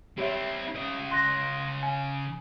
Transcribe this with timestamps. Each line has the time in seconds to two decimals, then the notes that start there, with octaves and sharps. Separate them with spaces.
0.18 C4 E4 G4 C#5 E5
0.76 C#3 D#5
1.11 C6 F#6 A#6
1.83 G#5